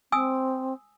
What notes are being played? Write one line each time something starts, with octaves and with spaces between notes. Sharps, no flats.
C4 G#5 D#6 E6